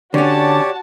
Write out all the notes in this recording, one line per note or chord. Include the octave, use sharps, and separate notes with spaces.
D3 C#4 F#4 G4 C#5 D5 A5